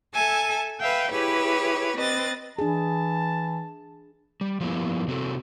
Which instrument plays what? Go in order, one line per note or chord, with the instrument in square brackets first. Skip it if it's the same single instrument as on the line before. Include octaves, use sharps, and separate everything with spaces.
[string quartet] A4 E5 G#5 A5
B4 E5 F5 G5
E4 G4 G#4 B4 C#5
C4 B4 D#5 A6
[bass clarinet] E3 [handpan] D4 G#4 [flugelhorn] A5
[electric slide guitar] G3
F3 G3 A#3 B3 E4
C3 C4 F#4 A4